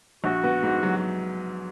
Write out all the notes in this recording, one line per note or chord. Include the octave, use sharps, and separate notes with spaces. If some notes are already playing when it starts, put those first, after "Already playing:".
A#1 F#4
B3
G#2
F#3